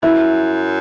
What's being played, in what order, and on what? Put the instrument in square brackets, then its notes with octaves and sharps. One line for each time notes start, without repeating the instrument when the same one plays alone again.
[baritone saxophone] F#2 [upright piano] E4